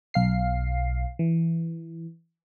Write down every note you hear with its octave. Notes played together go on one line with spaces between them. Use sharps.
B1 F5 C7
E3